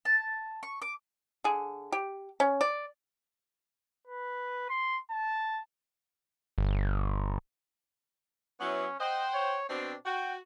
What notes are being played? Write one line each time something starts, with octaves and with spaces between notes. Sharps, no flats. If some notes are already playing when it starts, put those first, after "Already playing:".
A5
C#6
D6
D3 G#4
G4
C#4
D5
B4
C6
A5
G1
F#3 B3 C#4 E4
C5 D#5 F#5 G5
C#5
B2 C4 D4 D5
F#4 G5